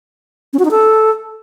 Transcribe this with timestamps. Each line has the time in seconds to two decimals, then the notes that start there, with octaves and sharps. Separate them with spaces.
0.53 C#4
0.59 F#4
0.65 D#4
0.71 A4